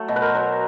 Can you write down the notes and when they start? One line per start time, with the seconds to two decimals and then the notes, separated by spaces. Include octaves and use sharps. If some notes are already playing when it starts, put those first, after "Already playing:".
Already playing: F#3 A3
0.08 B2
0.16 B4
0.22 A#4 C5
0.34 F#3